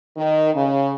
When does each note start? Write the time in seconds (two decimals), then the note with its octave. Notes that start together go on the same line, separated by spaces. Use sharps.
0.17 D#3
0.54 C#3